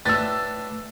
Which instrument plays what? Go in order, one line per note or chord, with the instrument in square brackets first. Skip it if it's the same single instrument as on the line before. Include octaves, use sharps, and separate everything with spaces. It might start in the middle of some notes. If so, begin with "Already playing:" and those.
[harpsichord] A2 D4 B4 [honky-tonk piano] E6 A6